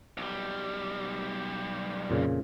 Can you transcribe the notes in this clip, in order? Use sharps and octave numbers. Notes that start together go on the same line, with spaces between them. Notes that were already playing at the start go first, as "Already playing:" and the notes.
B1 G3
F2 A#2 C#3